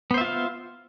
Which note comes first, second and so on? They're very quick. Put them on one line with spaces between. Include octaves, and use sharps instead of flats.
B3 C5 E5 F4 F5